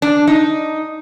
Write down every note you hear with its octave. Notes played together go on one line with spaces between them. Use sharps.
D4
D#4